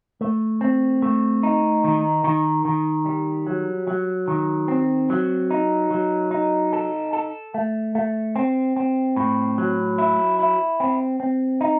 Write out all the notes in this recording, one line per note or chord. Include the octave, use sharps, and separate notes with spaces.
A3
C4
A3
D#4
D#3
D#3
D#3
G3
F#3
F#3
D#3
C4
F#3
D#4
F#3
D#4
A4
A4
A3
A3
C4
C4
A2
F#3
E4
E4
C4
C4
D#4